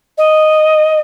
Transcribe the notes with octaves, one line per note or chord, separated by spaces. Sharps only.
D#5